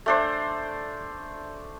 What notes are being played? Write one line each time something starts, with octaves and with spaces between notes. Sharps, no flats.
A3 D4 C5